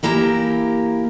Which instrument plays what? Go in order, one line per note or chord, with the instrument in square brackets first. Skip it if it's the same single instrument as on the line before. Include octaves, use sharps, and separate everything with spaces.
[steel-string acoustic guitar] E3 A#3 E4 G4 A#5